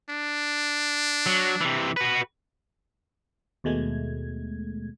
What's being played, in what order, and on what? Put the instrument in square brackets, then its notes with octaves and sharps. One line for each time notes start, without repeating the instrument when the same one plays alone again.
[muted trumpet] D4
[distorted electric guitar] F#3
C3 E3
F#4 B4
[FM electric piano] D#2 B2 G#3 A3 G#6